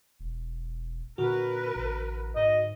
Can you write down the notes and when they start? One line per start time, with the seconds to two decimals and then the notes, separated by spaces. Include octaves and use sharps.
0.20 E1
1.18 A#2 D3 F#4 A#4 B4
1.75 A1
2.36 G#2 D#5